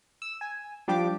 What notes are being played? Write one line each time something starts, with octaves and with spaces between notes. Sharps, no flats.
E6
G#5
F3 G3 D4 G4 D6